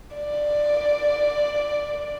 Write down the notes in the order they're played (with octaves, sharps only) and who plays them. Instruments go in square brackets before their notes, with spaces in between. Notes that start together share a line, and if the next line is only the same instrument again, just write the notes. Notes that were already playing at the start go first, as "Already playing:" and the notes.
[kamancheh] D5